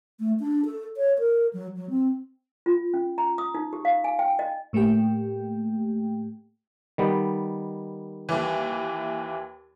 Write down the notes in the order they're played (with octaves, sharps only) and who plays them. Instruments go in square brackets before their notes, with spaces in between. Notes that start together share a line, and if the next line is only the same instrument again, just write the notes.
[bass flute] A3
D4
A4
C#5
A#4
F#3
F#3
C4
[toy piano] F4
C#4
A#5
D#6
D#4
G4
F5
G#5
G5
D#5
[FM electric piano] A2 A3 A#3 G4 G5
[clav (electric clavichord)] D#3 G3 B3
[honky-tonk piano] D#2 E3